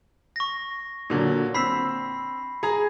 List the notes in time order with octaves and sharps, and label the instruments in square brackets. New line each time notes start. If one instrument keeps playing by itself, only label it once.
[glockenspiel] C#6 A#6
[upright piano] A#2 D3 F#3
[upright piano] C4 E6 [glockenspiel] B5 B6 C7
[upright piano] G#4 A#5